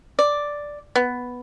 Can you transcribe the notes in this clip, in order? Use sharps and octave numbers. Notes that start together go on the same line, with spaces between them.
D5
B3